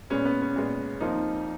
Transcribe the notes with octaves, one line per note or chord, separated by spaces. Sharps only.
A#2 G#3 B3 C#4
B3
C#4
A#2 G#3 B3
F2 F3 A#3 D#4